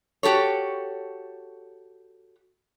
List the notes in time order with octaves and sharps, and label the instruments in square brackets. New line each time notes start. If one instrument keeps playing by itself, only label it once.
[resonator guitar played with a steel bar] F#4 G4 A4 C#5